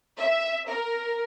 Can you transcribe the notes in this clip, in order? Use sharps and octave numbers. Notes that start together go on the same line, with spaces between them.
E5
A#4